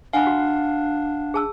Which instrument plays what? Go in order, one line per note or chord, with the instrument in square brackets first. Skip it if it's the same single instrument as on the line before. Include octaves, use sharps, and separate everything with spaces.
[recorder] D4 [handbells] F5 F#5 [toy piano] G#5 B5
[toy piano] F#4
G#4 A5 E6